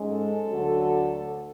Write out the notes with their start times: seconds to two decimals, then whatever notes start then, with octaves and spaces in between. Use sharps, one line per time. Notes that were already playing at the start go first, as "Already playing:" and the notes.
Already playing: G#2 G#3 C#4
0.09 A4
0.48 D2 D3 F#3